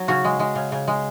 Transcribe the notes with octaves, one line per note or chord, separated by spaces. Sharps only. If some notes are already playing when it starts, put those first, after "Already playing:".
Already playing: F#3
C#3 F#4
G#3
G#3
C#3
C#3
G#3